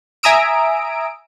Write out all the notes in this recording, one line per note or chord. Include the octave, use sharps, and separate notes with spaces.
E5 G#5 A#5 D#6 E6 D7